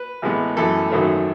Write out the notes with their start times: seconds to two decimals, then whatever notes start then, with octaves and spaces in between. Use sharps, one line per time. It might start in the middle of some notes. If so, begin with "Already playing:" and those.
Already playing: B4
0.22 A1 A2 G#3 B3
0.56 F#2 E3 A3 A4
0.90 G#1 F#2 D#3 F#3 A3